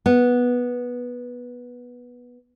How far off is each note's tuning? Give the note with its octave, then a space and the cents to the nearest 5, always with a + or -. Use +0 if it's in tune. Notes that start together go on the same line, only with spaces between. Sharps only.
B3 -10